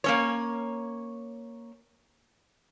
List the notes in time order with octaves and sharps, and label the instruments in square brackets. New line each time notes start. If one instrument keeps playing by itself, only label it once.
[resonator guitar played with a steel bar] A#3 C#4 C#5